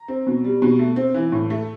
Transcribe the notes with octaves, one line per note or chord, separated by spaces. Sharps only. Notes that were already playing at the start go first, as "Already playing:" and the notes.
Already playing: A#5
C4
B2
G3
B2
A3
C4
E3
A2
A3